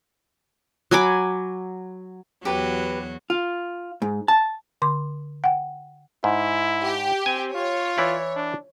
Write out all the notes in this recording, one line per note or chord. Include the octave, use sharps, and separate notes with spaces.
F#3 G#5 B5 D6
E2 F#3 F#4 G4 B4
F4
G#2
A5
D3 C6 D6
F#5 G5
G#2 E4
G4
C4 G#5
F4 C#5
E3 E4 D5
D4